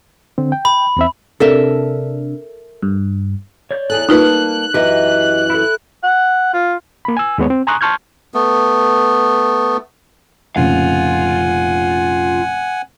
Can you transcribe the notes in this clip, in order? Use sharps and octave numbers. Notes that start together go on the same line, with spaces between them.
D3 C4
G5
B5
E2 C4 E5
C3 D4 A4 A#4 E5
G2
C#5 D5 G6
E2 G#4 A4 F#6
G3 A#3 D#4 F4 B4 A5
F#2 E3 G4 D#5 F#5
E4 A4
F#5
F4
A#3 B5
G#5 E6
D#2 G#3 B3 C#5
C4
G#5 A#5 C6 C#6 D#6 F#6
A5 C6 C#6 F6 G6 G#6
A3 B3
F1 A#2 C#3 F4 F5 F#5 G#5